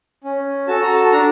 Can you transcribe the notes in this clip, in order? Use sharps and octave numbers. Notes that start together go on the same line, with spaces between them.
C#4
F#4 A4 A5
A#5
A5
D4 A#5